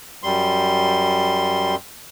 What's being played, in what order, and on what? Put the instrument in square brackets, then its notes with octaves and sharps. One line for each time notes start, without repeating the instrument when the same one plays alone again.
[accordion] F#2 G3 C6